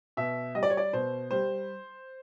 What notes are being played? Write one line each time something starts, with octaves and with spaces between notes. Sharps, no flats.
B2 E5
G3 D#5
D5
C#5
D5
B2 C5
G3 C5